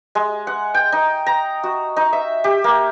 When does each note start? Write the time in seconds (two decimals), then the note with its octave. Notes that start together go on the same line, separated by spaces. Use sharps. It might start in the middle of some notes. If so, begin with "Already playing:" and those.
0.15 G#3
0.47 F#5
0.74 G5
0.92 D#4
1.26 A#5
1.63 F#4
1.96 D#4
2.13 E5
2.44 G4
2.64 A#3